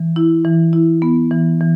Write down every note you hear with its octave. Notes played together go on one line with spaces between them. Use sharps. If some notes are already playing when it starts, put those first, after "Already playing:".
Already playing: E3
E4
E3
E4
B3
E3
E3